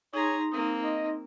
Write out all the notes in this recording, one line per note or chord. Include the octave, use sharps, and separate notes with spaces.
D#4 G#4 C#5 A#5 C6
A#3 C4 D#6
D#5